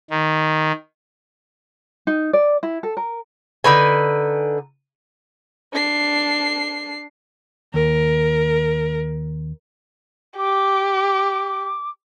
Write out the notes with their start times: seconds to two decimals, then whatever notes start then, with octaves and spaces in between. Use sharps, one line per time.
0.10 D#3
2.07 D#4
2.33 D5
2.63 E4
2.83 A4
2.97 A#4
3.64 D3 D#4 B4 G#5
5.73 D4 C7
7.74 D#2 A#4
10.38 G4 D6